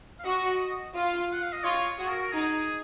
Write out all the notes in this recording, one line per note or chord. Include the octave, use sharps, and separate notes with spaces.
F5
F#4 D#5
F4 F5
F#5
F5
D#5
F4 C#5
F#4 G#4
A#4
A#4
D#4 G#4